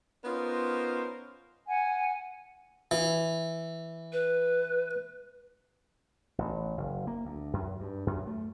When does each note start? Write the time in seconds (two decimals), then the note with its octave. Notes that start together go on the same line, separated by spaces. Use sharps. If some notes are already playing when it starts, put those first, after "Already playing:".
0.25 B3 C#4 D#4 F4 A#4 C5
1.67 F#5 G#5
2.91 E3
4.13 B4
6.38 A1
6.77 F#1
7.07 A#3
7.25 D2
7.53 F#2
7.81 G2
8.07 F#2
8.27 A3